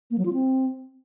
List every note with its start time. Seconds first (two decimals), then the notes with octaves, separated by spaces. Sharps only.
0.11 A#3
0.18 F#3
0.26 F4
0.33 C4